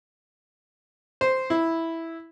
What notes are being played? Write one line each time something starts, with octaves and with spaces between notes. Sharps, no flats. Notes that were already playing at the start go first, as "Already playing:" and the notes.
C5
E4